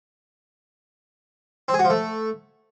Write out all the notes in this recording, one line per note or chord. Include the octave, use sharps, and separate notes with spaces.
C4
G#4
F#4
F3
A3